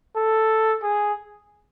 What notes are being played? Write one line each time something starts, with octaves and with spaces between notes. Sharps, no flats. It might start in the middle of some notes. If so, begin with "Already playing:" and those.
A4
G#4